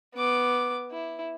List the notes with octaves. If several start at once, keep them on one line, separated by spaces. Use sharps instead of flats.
B3 D6
E4